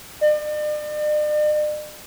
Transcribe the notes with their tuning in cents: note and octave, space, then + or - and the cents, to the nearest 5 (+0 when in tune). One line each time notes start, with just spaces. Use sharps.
D5 +45